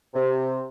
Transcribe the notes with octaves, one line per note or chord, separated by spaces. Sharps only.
C3